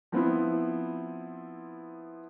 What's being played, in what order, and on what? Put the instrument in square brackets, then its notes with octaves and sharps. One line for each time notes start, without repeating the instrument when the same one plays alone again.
[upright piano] F3 B3 C4 E4